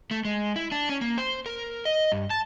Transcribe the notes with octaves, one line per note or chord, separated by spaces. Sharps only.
A3
G#3
E4
D4
C#4
A#3
C5
A#4
D#5
G2
A5